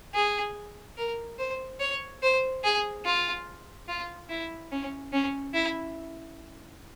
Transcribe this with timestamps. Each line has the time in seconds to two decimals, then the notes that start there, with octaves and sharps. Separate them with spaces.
0.15 G#4
0.97 A#4
1.39 C5
1.80 C#5
2.22 C5
2.64 G#4
3.05 F4
3.88 F4
4.29 E4
4.71 C#4
5.13 C#4
5.54 E4